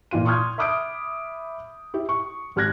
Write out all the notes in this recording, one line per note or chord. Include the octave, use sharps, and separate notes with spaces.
A#2 E3 F4 D#7
C6 C#6 D#6 F6 G6 G#6
E5 B5 D6 D#6 G6 D7
E4 G4 E5
C#6
G#1 G4 F6 F#6 G#6 A#6